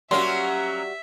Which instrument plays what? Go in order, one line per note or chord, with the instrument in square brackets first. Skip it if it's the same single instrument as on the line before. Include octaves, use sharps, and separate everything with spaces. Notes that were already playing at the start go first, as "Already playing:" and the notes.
[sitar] F#3 A#3 C#4 [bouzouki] G3 F#4 [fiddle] E5 [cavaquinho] C6